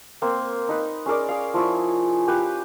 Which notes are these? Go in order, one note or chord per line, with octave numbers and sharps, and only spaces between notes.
A#3 C4
D#4 B4
C#4 G#4 A#4 D5
G#4 F5
F3 E4 C#6
G4 B4 F5